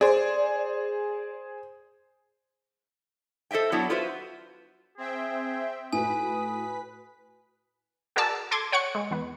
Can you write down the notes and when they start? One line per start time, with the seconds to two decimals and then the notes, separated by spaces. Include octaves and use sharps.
0.01 G#4 C5 D5
3.51 A4 C5 D#5 E5 G5
3.72 F#3 B3 D4 E4
3.90 F4 F#4 B4 C5 E5
4.98 C4 G#4 E5 G5
5.93 A2 F#4 B4 G#5 D#6 B6
8.16 F#4 G#4 A#4 D5 A5 E6
8.51 A4 C6 D6 G#6
8.72 C#5 F#5 C#6 C#7
8.95 G#3
9.11 E2 B3 B4